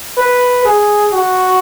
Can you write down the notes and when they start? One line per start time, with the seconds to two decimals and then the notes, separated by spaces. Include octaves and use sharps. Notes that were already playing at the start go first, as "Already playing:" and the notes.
0.18 B4
0.65 G#4
1.13 F#4